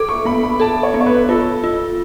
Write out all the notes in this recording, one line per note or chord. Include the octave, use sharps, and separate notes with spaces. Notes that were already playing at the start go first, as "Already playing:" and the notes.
Already playing: A4 D6
C#6
B3 B5
B5
A4 A5
C#5
B3
C#5
B4
F4 A4
F4